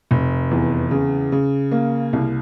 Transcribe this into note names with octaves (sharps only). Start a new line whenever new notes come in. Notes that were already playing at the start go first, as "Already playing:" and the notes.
F1
E2
C#3
C#3
A#3
C2